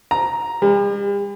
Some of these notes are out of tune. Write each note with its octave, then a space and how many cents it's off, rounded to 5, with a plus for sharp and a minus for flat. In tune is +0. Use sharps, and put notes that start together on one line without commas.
A#5 +5
G3 +45